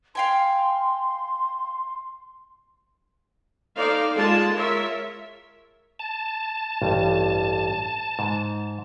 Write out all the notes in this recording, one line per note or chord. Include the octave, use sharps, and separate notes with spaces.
F5 G5 G#5 C6
D#4 A4 C5 D5 F5
G#3 F4 G#4 A5
F4 A#4 C#5 E5
A5
A1 G2
G#2